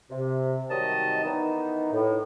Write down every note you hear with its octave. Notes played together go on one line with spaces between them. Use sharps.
C3
C3 D#3 F#3 G3 D#5 A5
D#3 E3 B3 D#4
A2